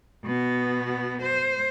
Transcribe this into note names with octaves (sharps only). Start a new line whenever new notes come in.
B2 B3
C5